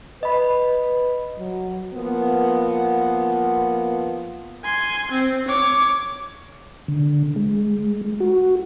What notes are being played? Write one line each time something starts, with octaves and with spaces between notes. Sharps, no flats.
B4 D#5 B5
F#3
F3 A#3 B3
G#5 C6
C4
C#5 D6
D3
G#3
F#4